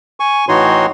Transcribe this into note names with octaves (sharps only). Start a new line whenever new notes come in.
G#5 C#6
A2 E3 D#4 F#4 C#5 C6